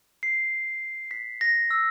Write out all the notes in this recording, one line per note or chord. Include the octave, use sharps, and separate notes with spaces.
C7
B6
A#6
E6